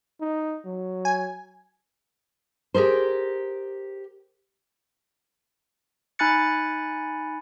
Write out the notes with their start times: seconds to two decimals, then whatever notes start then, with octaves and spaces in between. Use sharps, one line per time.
0.21 D#4
0.65 F#3
1.05 G#5
2.74 G4 G#4 A#4 C5
6.19 D#4 G#5 B5 F#6 A6 C#7